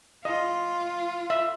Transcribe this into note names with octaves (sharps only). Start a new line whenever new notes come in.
F4 D#5
E5